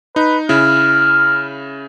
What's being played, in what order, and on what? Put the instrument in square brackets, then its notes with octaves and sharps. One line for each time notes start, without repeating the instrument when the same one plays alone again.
[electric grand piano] D#4 [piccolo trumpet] B4
[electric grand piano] C#3 E4 [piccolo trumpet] F6